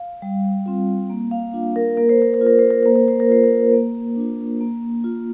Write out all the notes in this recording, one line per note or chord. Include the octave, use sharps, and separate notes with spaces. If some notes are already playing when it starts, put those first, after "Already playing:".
Already playing: F5
G3
C4 F4
A#3
F5
D4 F4
A#4
A#3 A#4
C5
A#4
C5
F4
A#4
C5
A#4
A#3 C5
A#4
C5
A#4
F4 C5
A#4
A#3
D4 F4
A#3
F4